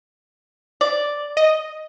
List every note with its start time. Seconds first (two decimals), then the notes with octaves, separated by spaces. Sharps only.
0.81 D5
1.37 D#5